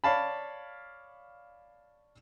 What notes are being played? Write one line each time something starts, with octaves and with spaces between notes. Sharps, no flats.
C#5 D5 F5 A5 B5